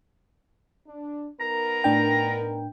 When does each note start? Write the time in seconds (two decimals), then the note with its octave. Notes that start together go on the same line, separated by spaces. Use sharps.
0.87 D4
1.41 B3 D#4 A#4 A#5
1.84 A2 D4 G5